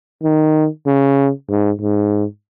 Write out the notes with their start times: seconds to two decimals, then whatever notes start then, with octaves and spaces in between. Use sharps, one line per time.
0.23 D#3
0.86 C#3
1.49 G#2
1.80 G#2